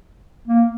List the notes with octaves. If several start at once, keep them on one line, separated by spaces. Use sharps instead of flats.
A#3